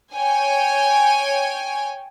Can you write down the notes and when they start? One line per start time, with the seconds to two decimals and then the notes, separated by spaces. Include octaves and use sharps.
0.15 C#5 G5 G#5